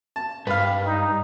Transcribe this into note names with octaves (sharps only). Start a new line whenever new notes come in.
A5
G2 B4 F5
D#4